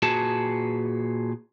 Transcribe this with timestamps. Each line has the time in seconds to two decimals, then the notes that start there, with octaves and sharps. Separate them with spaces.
0.02 A#2 F#4 G#4 B4 A5